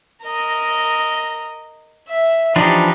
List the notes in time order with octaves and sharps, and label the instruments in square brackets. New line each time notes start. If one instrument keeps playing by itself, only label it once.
[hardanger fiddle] A#4 D#5
E5
[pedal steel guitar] E3 F3 D4 [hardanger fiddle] D#4 G4